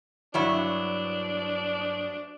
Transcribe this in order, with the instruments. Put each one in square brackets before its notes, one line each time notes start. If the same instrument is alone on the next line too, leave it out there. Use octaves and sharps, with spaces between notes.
[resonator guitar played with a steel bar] G2 F#3 E4 [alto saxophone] D4